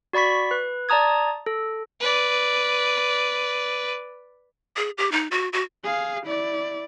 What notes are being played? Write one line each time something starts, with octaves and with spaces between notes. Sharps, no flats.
F#4 D5 B5 C#6 B6
B4
D5 A5 A#5 D#6 G#6
A4
B4 D5
G#4
G4
D#4
F#4
F#4
G#4 F5
E4 D5